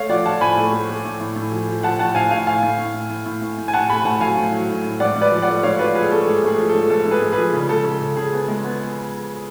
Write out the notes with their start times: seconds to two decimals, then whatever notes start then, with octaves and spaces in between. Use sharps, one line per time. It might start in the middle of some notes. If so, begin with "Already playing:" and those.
Already playing: A3 C#5 F5
0.09 F3 D5 F#5
0.26 F3 F#5 A5
0.41 A2 G#5 B5
0.57 A3
0.73 A3
0.89 A3
1.05 A2
1.21 A2
1.36 A2
1.52 F3
1.68 F3
1.83 F3 F#5 A5
1.99 A2 F#5 A5
2.15 A2 F5 G#5
2.31 A2 F5 G#5
2.47 A2 F5 G#5
2.62 A2
2.79 A2
2.94 A2
3.10 A2
3.26 A2
3.42 A2
3.58 A2
3.68 G#5
3.73 A2 F#5 A5
3.89 A3 G#5 B5
4.05 A2 F#5 A5
4.21 F#3 F5 G#5
4.37 A2
4.53 F#3
4.69 A2
4.84 A2
5.00 G#2 D5 F#5
5.16 G#2
5.21 B4 D5
5.32 F3
5.42 D5 F#5
5.48 A3
5.63 G#2 C#5 F5
5.79 F3 B4 D5
5.94 F3 G#4 B4
6.11 A3 A4
6.27 G#2 G#4
6.43 A3 G#4
6.58 F3
6.69 A4
6.74 G#2
6.90 G#2 A4
7.05 G#2
7.11 G#4 B4
7.22 G#2
7.32 G#4 B4
7.38 F3
7.53 C#3
7.69 G#3 A4
7.85 C#3 A4
8.01 C#3
8.16 C#3 G#4
8.33 B3
8.48 G#3
8.64 B3